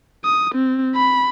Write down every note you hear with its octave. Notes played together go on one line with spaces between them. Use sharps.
D#6
C4
B5